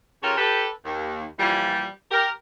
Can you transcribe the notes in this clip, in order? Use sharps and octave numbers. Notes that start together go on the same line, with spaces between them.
C#3 F4 G4 A4 A#4 C#5
G4 A4 B4
D#2
A#2 E3 F3 G3
G4 A#4